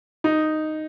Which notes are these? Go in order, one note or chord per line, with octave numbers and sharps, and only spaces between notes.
D#4